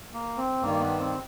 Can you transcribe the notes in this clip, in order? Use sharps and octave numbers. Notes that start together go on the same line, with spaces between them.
A#3
C4
G2 D#3 G3 A#3
B3
C4